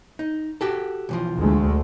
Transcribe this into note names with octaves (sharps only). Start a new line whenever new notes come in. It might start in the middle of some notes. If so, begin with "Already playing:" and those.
D#4
F#4 G4 A4
B1 E3 F3
D2 G#3 A3